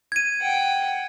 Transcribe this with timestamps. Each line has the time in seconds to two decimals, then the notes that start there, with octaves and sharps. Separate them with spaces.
0.12 G#6 D#7
0.41 F#5 G5